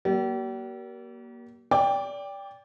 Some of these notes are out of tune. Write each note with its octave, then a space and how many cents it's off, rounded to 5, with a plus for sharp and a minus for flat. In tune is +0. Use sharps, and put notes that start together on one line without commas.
G3 -40 A#3 +25
D5 -25 G5 +20 D6 +0